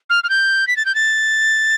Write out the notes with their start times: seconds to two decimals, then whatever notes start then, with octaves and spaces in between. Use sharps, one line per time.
0.10 F6
0.24 F6
0.30 G6
0.67 B6
0.77 A6
0.85 G6
0.95 A6